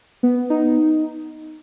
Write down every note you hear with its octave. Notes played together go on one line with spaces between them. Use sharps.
B3
D#4